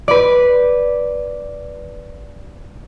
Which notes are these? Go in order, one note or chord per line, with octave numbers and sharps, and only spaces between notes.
B4 D5